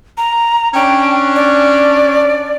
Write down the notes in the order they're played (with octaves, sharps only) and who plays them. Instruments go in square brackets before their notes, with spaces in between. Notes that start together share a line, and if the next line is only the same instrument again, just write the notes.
[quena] A#5
[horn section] C#4 D4 [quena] G5
[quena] D5